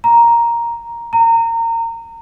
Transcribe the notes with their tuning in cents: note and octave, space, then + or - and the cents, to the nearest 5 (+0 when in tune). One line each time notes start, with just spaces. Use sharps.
A#5 +5
A#5 -25